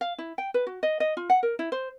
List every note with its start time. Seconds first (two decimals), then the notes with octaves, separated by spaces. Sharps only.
0.01 F5
0.18 E4
0.38 G5
0.54 B4
0.67 F#4
0.83 D#5
1.00 D#5
1.17 F4
1.30 F#5
1.43 A#4
1.59 E4
1.72 C5